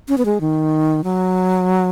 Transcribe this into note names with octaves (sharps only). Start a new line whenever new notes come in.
C#4
B3
G#3
D#3
F#3